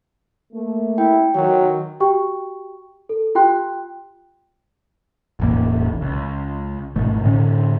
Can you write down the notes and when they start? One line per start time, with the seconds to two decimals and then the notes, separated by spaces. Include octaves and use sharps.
0.53 A3 A#3
0.98 E4 G5
1.35 D#3 F#3
2.00 F#4 G4 G5 C#6
3.09 A4
3.35 F4 G4 G5 C6 F#6
5.40 E1 A1 A#3
6.01 C#2
6.96 G#1 B2 A3
7.24 A2 D3 C#4